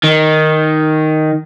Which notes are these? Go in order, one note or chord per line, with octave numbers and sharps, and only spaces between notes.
D#3